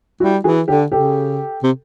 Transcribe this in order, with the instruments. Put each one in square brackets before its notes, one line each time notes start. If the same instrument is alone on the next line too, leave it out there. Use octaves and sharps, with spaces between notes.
[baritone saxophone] G3 [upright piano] E4 F#4
[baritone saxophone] E3 [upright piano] F#4 G#4
[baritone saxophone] D3 [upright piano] G4 A4
[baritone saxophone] C#3 [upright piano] G4 A4
[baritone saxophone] C3